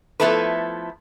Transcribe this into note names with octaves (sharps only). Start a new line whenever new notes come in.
F3 A3 B3 E4 A4 B4